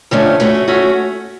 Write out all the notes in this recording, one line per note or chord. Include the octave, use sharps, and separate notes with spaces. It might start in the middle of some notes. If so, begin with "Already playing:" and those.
F2 D3 F3 A3 C#4
A3 C#4 F#4
A3 C#4 F#4